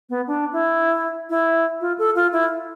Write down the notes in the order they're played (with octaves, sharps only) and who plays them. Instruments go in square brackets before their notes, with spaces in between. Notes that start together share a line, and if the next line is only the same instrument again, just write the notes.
[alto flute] B3
D4
E4
E4
F4
A4
F4
E4